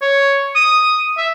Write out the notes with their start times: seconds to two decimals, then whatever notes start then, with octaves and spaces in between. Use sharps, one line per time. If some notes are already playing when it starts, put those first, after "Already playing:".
0.02 C#5
0.55 D#6
1.17 E5